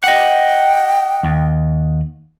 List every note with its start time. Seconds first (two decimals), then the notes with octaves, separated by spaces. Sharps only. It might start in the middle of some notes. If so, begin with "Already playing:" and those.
0.04 D#5 F#5 G5
1.23 D#2